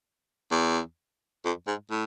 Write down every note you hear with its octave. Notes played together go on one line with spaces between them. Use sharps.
E2
F2
G#2
A2